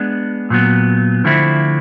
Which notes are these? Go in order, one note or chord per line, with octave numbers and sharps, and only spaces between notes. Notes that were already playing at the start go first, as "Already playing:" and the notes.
Already playing: G#3 B3 D4
A#2 F#3 B3
D3 F3 A3 C4 E4